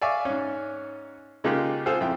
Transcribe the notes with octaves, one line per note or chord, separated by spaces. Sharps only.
D5 E5 F5 G#5 C#6 D6
G#2 C#4
C#3 G#3 A#3 D#4 F4 G4
C4 F4 G#4 A4 C5 F5
F2 E4 G5